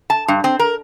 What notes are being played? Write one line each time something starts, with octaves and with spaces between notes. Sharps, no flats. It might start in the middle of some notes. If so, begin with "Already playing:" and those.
A5
G2
C4
A#4